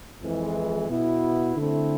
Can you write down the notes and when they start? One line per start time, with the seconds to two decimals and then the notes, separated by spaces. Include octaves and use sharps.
0.22 F2 E3 G#3
0.90 B2 B3 E4
1.57 D3 A3 C4 E4